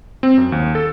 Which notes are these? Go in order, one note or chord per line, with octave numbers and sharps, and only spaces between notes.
C4
F#2
D#2
A4